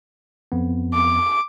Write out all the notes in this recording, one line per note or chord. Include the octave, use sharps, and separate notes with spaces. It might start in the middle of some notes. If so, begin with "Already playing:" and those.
F2 B3
D6